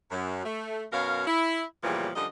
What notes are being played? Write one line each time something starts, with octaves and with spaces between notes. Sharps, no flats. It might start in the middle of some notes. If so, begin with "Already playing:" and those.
F#2
A3
F#2 B2 A#4 C#5 F5
E4
E2 A#2 C#3 E3 F3 G3
F#2 D3 F3 G3 D#5